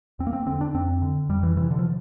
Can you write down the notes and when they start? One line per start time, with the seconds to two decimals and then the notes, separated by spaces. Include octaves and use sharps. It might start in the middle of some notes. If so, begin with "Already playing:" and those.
0.19 E2 C4
0.27 A#3
0.33 C4
0.47 D3 C4
0.61 D4
0.74 F2 C4
1.02 D3
1.29 F2 G3
1.43 E3
1.57 C3 E3
1.71 D3
1.79 F3